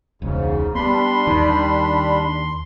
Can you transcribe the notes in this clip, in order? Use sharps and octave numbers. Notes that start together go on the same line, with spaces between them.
E1 C#2 G#2 C#3
G3 B3 D4 B5 C6
D#2 D#3